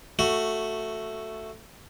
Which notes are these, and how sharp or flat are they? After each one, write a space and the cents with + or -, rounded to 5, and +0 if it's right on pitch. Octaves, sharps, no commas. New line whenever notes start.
A3 +5 F#4 +0